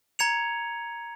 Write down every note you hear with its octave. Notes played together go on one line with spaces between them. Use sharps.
A#5 G#6 C#7 F7